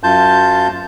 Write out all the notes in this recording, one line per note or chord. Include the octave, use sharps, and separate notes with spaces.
F#2 F4 A5 G6